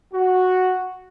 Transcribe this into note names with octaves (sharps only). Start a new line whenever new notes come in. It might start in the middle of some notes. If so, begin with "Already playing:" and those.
F#4